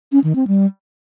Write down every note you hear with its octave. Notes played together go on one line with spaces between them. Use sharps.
C#4
D#3
C4
G3